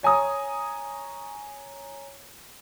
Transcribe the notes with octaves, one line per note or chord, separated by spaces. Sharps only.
C#5 G#5 A#5 D#6